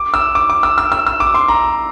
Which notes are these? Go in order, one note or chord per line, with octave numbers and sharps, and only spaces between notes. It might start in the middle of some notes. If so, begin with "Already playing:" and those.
Already playing: D6
E6
D6
D6
E6
E6
E6
E6
D6
C6
A#5